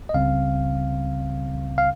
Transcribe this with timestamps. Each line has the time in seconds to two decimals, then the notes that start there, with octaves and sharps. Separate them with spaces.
0.09 D#5
0.14 C#2 C#3 G3 C4 F5
1.78 F5